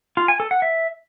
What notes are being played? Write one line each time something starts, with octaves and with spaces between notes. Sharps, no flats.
F4
G#5
A4
F#5
E5